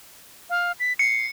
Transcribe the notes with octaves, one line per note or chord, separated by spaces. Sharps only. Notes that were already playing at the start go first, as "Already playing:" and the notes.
F5
B6
C7 C#7